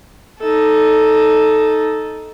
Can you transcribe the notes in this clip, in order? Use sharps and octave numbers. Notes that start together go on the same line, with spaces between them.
D#4 A4